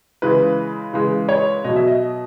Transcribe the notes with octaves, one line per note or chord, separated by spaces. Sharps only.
C#3 E3 G#3 B4
C#3 E3 G#3
C#5
B2 F#3 D#5
E5
D#5